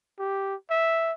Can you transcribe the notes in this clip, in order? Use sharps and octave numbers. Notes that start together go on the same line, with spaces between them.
G4
E5